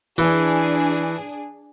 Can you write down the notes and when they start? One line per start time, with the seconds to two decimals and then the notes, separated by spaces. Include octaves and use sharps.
0.18 E3 D4 G#4